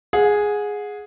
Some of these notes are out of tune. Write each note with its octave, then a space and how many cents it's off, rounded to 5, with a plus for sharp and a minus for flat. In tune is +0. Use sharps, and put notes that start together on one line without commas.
G#4 +0 F#5 -30